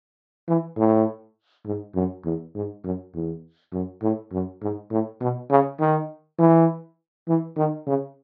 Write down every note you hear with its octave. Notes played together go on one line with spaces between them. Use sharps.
E3
A2
G#2
F#2
E2
G#2
F#2
E2
F#2
A2
F#2
G#2
A2
B2
C#3
D#3
E3
E3
D#3
C#3